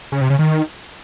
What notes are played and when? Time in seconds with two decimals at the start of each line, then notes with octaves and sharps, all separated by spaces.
0.12 C#3
0.21 C3
0.30 C#3
0.39 D#3